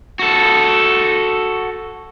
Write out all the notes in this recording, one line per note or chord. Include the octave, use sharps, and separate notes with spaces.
F#4 A4